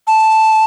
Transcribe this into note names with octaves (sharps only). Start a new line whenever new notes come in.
A5